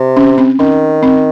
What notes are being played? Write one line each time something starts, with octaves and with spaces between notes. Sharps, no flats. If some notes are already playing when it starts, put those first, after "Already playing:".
Already playing: C3
C#4
C4
D#3 C#4
C4